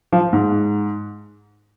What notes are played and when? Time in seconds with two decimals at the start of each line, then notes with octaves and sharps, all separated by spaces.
0.12 F3
0.33 G#2